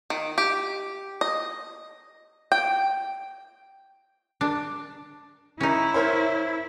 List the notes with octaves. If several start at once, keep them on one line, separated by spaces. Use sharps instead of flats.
D#3
G4
D#5
G5
D4
C#4 D#4 E4
A#4 C5 C#5